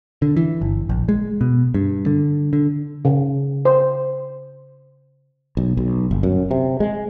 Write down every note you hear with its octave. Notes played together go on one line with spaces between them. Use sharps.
D3
E3
G1
A#1
G#3
B2
G2
D3
D3
C#3
C5
B1
B1
G1
F#2
C3
G#3